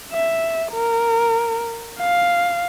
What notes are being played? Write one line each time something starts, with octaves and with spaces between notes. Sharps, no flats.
E5
A#4
F5